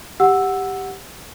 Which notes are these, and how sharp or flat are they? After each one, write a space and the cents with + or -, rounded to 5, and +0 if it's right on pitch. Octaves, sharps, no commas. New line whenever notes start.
G4 +0 F#5 +0 E6 +0